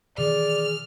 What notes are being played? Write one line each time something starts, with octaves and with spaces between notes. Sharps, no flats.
B2 D#3 E3 G#4 D5 F6